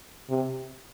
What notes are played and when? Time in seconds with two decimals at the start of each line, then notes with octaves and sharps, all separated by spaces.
0.30 C3